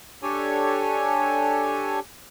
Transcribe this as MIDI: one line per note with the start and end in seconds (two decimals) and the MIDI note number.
0.23 2.00 62
0.23 2.00 67
0.23 2.00 69
0.23 2.00 73
0.23 2.00 80